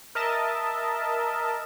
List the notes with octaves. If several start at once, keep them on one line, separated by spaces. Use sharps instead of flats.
A#4 D#5 E5 A5